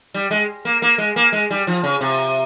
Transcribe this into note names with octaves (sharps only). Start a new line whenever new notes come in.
G3
G#3
A#3
A#3
G#3
A#3
G#3
G3
F3
C#3
C3